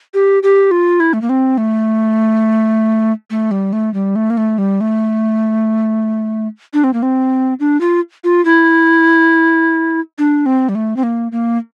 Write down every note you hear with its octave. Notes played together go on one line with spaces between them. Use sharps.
G4
G4
F4
E4
A3
A#3
C4
A3
A3
G3
A3
G3
A3
A#3
A3
G3
A3
D4
C4
A#3
C4
D4
F4
F4
E4
D4
C4
G3
A3
C4
A#3
A#3